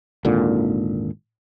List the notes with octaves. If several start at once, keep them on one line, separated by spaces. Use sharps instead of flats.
G#1 D#2 A#2 D3